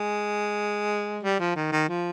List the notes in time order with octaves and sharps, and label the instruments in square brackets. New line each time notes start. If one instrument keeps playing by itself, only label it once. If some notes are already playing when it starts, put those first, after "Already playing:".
Already playing: [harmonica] G#3
G3
F3
D#3
D#3
F3